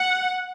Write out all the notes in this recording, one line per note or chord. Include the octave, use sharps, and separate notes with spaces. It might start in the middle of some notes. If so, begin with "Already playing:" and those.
Already playing: F#5